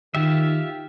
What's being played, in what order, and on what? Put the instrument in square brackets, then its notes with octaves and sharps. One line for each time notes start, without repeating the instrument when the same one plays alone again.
[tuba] D#3 [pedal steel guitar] F4 G4 E5